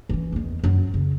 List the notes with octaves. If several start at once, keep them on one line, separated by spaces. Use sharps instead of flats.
E3 C#4
E2 D#3
F#2
C#3